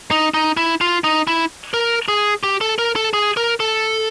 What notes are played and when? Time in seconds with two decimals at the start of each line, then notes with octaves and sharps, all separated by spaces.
0.11 D#4
0.34 D#4
0.57 E4
0.81 F4
1.04 D#4
1.27 E4
1.74 A#4
2.08 G#4
2.43 G4
2.61 A4
2.78 A#4
2.96 A4
3.13 G#4
3.37 A#4
3.60 A4